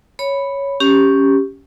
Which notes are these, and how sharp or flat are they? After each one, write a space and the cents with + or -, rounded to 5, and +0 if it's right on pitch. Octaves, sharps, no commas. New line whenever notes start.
C#5 +0 B5 +0
C#4 +0 G4 +0